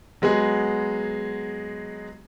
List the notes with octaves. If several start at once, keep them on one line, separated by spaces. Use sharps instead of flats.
F#3 G#3 B3 G#4